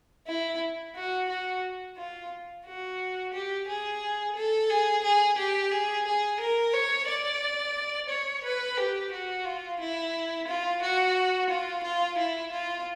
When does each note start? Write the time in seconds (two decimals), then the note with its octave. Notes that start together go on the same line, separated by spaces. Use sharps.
0.27 E4
0.96 F#4
1.29 F#4
1.98 F4
2.66 F#4
3.33 G4
3.68 G#4
4.36 A4
4.70 G#4
5.04 G#4
5.38 G4
5.72 G#4
6.06 G#4
6.40 A#4
6.74 C#5
7.08 D5
8.10 C#5
8.44 B4
8.78 G4
9.12 F#4
9.46 F4
9.80 E4
10.48 F4
10.82 F#4
11.50 F4
11.84 F4
12.18 E4
12.52 F4